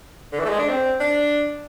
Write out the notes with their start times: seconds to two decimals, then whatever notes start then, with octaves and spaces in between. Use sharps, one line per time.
0.33 D3
0.39 E3
0.45 A3
0.49 G#3
0.59 D4
0.69 C4
1.00 D4